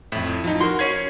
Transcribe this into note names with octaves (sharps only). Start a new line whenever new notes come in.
F2 A2 E4
F3 D#4
F#4 A#4 C6
C#4 G#4 C#5 F5 G#6